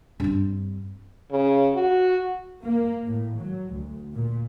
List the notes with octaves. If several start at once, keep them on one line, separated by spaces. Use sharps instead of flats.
G2 C4
C#3
F#4
A#3
A2
F#3
D2
A#2